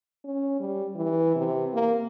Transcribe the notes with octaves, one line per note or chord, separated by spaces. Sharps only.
C#4
G3
E3
C3
A#3